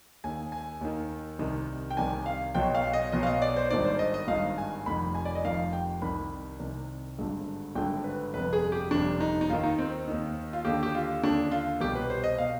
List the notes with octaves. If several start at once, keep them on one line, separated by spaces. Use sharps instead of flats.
D#2 D#3 G#5
G#5
D#2 D#3
C2 C3 D#3
G5
C2 C3 D#3 G#5
F5
B1 B2 G5
F5
D#5
B1 B2 D#5
F5
D#5
D5
C5
G#1 G2 D#3 D5
C5
D#5
D#5
G#1 G2 D#3 F5
G#5
F1 F2 D#3 B5
G#5
D5
D#5
F1 F2 D#3 F5
G5
C2 C3 D#3 B5
C2 C3 D#3
G#1 G2 D3
G#1 G2 D3 G5
B4
G1 F2 C3 B4
G#4
G4
G1 F2 C3 D4
D#4
D#4
D#2 D#3 F4
D#4
C4
D#2 D#3
F4
D#2 D3 G4
G4
F4
D#2 D3 D4
F4
C2 B2 G4
B4
C5
D#5
B2 F5